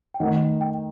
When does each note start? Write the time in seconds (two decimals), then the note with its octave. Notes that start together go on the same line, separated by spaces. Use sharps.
0.14 G5
0.20 D#3 A3 D#4 F#5
0.61 G5